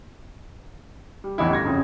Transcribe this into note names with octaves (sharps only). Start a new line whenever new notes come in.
G3
A1 E2 E3 D#4 E4
D2 G2 G#6 A#6
F2 C#3 F3